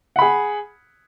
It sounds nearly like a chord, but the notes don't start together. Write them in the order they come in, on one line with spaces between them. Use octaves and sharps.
F#5 B5 G#4